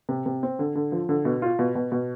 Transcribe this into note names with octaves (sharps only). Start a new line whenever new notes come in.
C3
C3
C4
D3
D3
F3
D3
B2
F4
B2
B2
B2